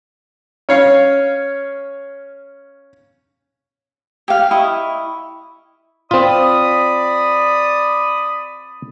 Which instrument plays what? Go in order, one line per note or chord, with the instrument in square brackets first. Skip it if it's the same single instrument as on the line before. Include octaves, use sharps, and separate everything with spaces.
[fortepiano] C#4 C#5 F5
[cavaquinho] G4 F5
E4 D#5 C#6
[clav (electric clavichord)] C4 F4 [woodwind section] D5 B5 D#6